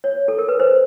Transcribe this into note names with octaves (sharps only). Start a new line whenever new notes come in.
C#5
A4
A#4
B4
C5